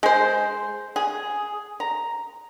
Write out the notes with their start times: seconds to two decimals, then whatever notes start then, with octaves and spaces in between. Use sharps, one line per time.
0.03 G#3 C5
0.96 G#4
1.80 A#5